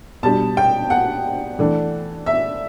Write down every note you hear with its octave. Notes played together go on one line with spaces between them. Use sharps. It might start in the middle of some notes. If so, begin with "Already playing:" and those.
B2 G3 D4 A5
G5
F#5
E3 A3 D4
E5